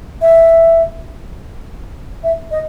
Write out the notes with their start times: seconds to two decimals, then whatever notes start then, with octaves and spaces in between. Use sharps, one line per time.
0.22 E5
2.24 E5
2.51 D#5